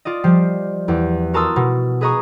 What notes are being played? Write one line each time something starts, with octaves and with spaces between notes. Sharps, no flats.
F4 D5 D#5
F3 G3 G4 C7
E2 G4
F#4 A#4 A5 C6 D#6 E6
B2
G#4 B4 D#5 A#5 C#6 D#6